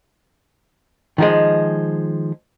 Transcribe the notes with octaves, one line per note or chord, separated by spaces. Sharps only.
D#3 F3 G#3